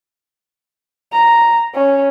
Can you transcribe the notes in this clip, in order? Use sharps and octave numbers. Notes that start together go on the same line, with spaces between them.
A#5
C#4